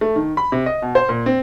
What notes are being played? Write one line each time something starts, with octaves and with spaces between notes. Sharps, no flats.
A3
D#3
B5
C3
D#5
B2
C5
A#2
C4